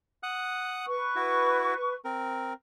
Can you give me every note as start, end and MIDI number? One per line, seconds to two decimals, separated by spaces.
0.23 0.86 78
0.23 0.86 87
0.23 0.86 90
0.87 1.93 71
0.87 1.93 85
1.16 1.74 64
1.16 1.74 66
2.05 2.53 60
2.05 2.53 70